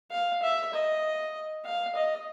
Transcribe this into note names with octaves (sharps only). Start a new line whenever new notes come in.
F5
E5
D#5
F5
D#5